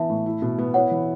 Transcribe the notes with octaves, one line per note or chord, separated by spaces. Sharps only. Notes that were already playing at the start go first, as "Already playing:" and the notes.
Already playing: E3 B3 E5 A5
A2
E4
B2
B3
E4 C#5 F#5
E3